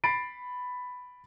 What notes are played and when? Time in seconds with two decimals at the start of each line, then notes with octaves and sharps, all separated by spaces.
0.04 B5 A6 C7 D7